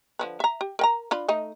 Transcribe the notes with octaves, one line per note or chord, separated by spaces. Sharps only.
D3 F3 B4
E5 A#5
G4
A#4 G5 A#5
D4 F4 B5
A3 D#4 D#5